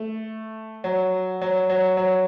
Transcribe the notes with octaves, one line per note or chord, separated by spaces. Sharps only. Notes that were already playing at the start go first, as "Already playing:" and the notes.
Already playing: A3
F#3
F#3
F#3
F#3